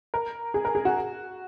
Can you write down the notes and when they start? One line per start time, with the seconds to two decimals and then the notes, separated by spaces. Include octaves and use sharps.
0.14 A#4
0.54 G#4
0.65 A#4
0.75 G#4
0.85 F#4